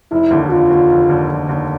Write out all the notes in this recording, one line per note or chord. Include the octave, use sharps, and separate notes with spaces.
F1 E4
D#2 D3
F1 F4
D#2 D3
F1
D#2 D3
F1
D#2 D3